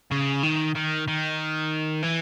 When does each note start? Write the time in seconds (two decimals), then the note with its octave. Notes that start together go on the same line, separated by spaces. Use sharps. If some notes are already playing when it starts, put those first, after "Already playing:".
0.11 C#3
0.43 D#3
0.75 D#3
1.08 D#3
2.03 E3